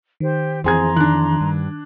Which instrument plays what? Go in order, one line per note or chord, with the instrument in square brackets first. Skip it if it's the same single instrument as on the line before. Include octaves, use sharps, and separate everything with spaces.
[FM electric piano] D#3 [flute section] G4 C5
[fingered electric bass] F2 E3 [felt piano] C4 G#4 G#6 [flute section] A#5 C6
[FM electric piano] D#3 [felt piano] D4 F#6
[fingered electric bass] G2